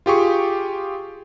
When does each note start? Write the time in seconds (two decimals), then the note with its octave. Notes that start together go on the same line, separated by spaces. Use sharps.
0.06 F4 G4 G#4 C#6